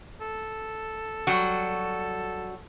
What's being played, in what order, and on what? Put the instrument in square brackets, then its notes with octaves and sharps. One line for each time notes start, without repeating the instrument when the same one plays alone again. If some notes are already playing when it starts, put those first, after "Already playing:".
[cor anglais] A4
[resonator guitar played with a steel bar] F#3 G3 F#4